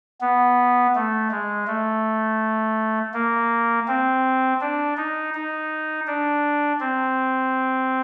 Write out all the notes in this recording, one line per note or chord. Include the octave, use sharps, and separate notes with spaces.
B3
A3
G#3
A3
A#3
C4
D4
D#4
D#4
D4
C4